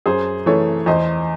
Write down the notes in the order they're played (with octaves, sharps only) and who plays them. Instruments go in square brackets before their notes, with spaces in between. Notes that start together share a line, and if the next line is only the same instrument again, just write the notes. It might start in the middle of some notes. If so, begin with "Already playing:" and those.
[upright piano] F#2 G#4 C5
E3 A3 A4 C#5
E2 C5 D#5